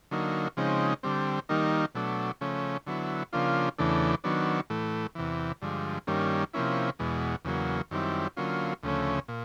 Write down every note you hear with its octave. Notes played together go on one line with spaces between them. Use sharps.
D3 F#3 A#3 D#4
C#3 F3 G#3 C4 D#4
D3 G3 C4
D#3 G3 A#3 D#4
B2 F#3 A3 D4
C#3 F3 A3 C#4
D3 F#3 B3 E4
C#3 F3 A#3 D4 F4
E2 C#3 E3 A3 D4
D#3 F#3 B3 D4
A2 E3 A3
E2 C3 E3
G2 D3 F3 G#3
G2 D#3 G3 A#3 C#4
C3 F3 A#3 C#4 E4
E2 B2 G#3
E2 C#3 F#3 A#3
F#2 D#3 G3 C4 E4
D3 F#3 A#3 C#4 F4
D2 C#3 F3 A3 C#4
A#2